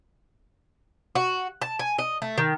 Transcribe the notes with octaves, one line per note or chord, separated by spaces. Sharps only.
F#4
A5
G#5
D#5
A3
D#3